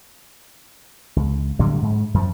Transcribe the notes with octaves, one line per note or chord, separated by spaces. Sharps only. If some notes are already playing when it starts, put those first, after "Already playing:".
C#2
A2 D3 F#3 G3
G#2
F#2 F3